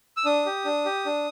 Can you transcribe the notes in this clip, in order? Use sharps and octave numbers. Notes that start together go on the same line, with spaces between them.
E6
D4 D#6
G4
D4
G4
D4